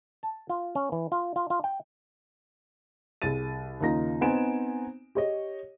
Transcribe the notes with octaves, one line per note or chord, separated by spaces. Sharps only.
A5
F4
C#4
E3
F4
F4
F4
G5
C2 G#4 A6 D#7
D#2 C#3 A#3 D#4 F4 A#6
B3 C4 D#4 G#5 D7 E7
G4 C#5 D#5